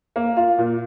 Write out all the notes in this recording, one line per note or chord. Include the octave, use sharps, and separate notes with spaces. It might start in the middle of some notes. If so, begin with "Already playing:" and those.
A#3
F4
A#2